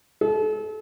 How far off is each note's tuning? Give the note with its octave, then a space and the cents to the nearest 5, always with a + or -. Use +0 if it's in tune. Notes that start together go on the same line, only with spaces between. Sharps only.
A4 -35